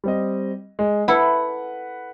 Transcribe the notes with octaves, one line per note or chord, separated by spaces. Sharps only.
G3 C4 D#5
G#3
E4 A4 B4 F#5